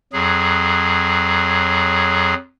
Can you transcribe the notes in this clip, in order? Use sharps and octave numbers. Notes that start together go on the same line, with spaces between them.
F2 F#3 G#4